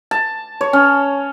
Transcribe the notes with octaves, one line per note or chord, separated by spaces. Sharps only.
A5
C#5
C#4